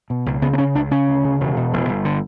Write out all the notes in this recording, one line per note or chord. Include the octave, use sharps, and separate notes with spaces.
B2
C#2
C#3 B3
B3
C#3 C#4
C#2 D4
C#3 C#4
D2
C#3
E1
B2
E1
G1
D3